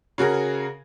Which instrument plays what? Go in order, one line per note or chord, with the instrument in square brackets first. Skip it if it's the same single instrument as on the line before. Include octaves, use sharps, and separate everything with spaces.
[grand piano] C#3 F#4 G#4 A#4